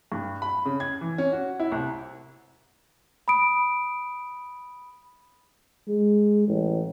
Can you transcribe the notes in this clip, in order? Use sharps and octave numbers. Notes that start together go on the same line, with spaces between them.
G2
B5
C#3
G#6
E3
C#4
F#4
E4
C2
B5 D#6 D7
G#3
A1